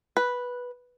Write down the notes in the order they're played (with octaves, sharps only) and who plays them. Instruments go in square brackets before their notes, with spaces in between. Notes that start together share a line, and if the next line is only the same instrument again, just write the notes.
[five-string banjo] B4